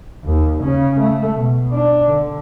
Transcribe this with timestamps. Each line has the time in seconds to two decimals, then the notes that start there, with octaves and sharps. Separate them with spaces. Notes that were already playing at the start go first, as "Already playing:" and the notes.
0.24 D#2
0.62 C#3 C#4
1.00 A3
1.35 B2
1.72 D4
2.06 D3